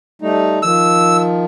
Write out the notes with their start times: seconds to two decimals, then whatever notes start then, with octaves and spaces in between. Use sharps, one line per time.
0.22 G3 A3 D#4
0.63 D#3 F3 E6